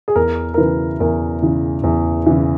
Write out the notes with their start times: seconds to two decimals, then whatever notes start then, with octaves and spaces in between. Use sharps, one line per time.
0.08 G#4
0.16 E2 A#4
0.54 A#4
0.58 C#3 E3 B4
1.00 E2 A#4
1.42 C#3 E3
1.83 E2
2.26 C#3 E3